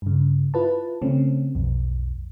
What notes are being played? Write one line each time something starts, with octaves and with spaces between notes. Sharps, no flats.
G2 C#3
E4 F4 B4 A5
C#3 A3 C4 C#4
B1 F2